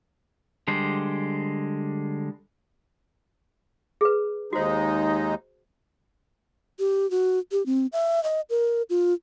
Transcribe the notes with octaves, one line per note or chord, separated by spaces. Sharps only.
D3 G3 G#3 C5
G#4 B4
D#2 G#3 D#4 F#4 C5
G4
F#4
G4
C4
E5
D#5
A#4
F4